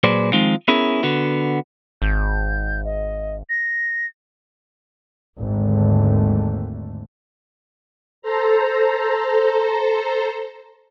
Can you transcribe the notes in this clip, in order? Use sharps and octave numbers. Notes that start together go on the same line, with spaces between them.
A#2 F#3 G#4 B4 C5 D5
D#3 F3 G#3 C4 D#4 F4
B3 C#4 E4 G#4 A#4
D3 B3 F#4
G#1 G6
D#5
A#6
G#1 D#2 D3 A3
A4 C5 A#5